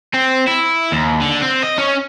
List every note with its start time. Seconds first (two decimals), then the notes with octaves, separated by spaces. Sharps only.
0.14 C4
0.47 E4
0.92 D#2
1.21 D3
1.42 C4
1.63 D#5
1.78 C#4